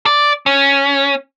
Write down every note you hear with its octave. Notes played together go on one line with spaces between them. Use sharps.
D5
C#4